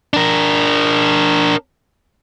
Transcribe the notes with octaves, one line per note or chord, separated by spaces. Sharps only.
D4 A#4